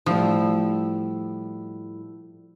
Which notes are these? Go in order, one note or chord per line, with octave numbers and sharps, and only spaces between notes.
A2 F3 G3 E4